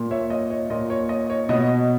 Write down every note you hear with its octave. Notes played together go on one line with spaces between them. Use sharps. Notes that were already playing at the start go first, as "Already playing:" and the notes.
Already playing: A#2
C#5 E5
D#5
C#5
A#2 D#5
C#5
D#5
C#5
B2 D#5